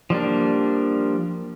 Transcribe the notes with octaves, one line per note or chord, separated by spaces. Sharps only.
F3 G3 A#3 D4